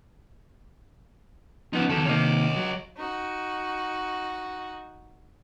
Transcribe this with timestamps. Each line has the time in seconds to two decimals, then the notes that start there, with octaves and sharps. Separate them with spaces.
1.73 F3 B3 C#4 D#4
1.89 E2 D#3 F#3 A4
2.05 C3 D#3 A#3 C#5 D#5
2.56 F#3
2.97 D#4 F#4